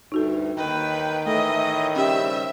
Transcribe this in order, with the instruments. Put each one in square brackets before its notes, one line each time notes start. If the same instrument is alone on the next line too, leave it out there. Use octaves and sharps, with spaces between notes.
[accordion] D2 G2 [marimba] D#4 F#4 A4
[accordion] D#2 G5 [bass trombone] D#3 [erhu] B4
[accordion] A2 E3 E4 [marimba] A3 A4 [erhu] D#5
[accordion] C#3 G3 C4 [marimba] C#4 G4 G5 [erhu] E5